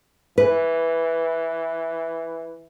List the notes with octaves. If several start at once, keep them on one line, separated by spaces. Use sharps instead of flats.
E3 B4